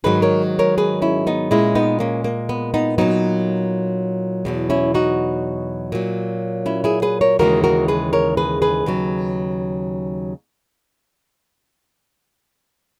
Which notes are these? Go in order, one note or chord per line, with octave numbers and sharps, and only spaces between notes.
G#2 D#3 F#3 G#4 B4
A#4 C#5
A#4 C#5
G#4 B4
C#4 E4
B3 D#4
A#2 G#3 C#4 E4
B3 D#4
A#3 C#4
A#3
B3
B3 D#4
A#2 F#3 B3 D#4
E2 B2 F#3
C#4 E4
D#4 F#4
A#2 F#3
C#4 E4
E4 G#4
G#4 B4
A#4 C#5
D#2 C#3 E3 G#3 F#4 A#4
F#4 A#4
G#4 B4
A#4 C#5
G#4 B4
G#4 B4
D#2 C#3 F#3